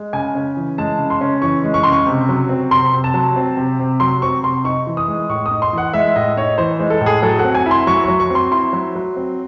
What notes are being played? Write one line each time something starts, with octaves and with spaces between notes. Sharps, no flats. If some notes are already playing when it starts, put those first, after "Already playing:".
Already playing: G#3
C#3 G#5
C#4
E3
G#3 A5
C#3
C6
C#4
E3 C#6
G#3
C#6
C#3 C6
C#6
C3
F#3
C4
C3 C6
C3
A5
F#3
C4
C3
C3
F#3 C6
C4 C#6
C3 C6
D#4 C#6
E3
D#6
G#3
A2 C#6
D#6
D#4
C6
E3 F#5
G#3 E5
A2 D#5
D#4 C#5
E3 C5
G#3
A4
A2
G#4
F#3 A4
C4 F#5
G#5
E4
C6
F#3 C#6
F#3 C#6
C#6
C4 C6
E4 C6
F#3
F#3
C4